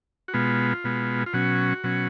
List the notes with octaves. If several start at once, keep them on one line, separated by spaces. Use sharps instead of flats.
F#4
B2 G#3 B3 F4
B2 G#3 B3
F4
B2 F#3 C#4 F#4
B2 F#3 C#4